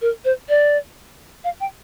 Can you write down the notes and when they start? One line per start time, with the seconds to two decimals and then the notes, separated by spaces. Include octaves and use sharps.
0.01 A#4
0.25 C5
0.49 D5
1.44 F5
1.60 G5